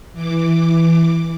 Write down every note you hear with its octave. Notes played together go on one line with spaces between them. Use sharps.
E3 D6